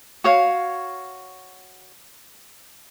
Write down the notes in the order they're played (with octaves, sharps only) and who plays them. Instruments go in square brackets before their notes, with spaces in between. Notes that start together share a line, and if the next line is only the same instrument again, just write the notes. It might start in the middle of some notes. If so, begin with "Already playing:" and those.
[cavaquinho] F#4 C#5 F5